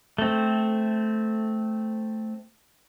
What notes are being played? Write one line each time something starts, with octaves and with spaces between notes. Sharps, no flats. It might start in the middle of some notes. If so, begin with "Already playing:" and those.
A3 C4